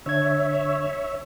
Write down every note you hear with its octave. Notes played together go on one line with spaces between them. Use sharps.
D3 D4 C#5 E5 G#6